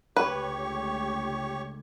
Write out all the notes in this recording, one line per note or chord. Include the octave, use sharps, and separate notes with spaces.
C#2 D3 A3 G4 B4 C#5 C#6